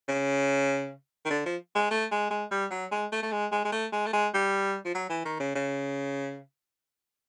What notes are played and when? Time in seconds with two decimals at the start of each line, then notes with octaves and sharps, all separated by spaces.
0.09 C#3
1.26 D#3
1.30 D3
1.46 F3
1.76 G#3
1.91 A3
2.12 G#3
2.31 G#3
2.51 G3
2.71 F#3
2.92 G#3
3.13 A3
3.23 A3
3.32 G#3
3.52 G#3
3.65 G#3
3.72 A3
3.93 G#3
4.06 A3
4.13 G#3
4.34 G3
4.85 F3
4.95 F#3
5.10 E3
5.25 D#3
5.40 C#3
5.56 C#3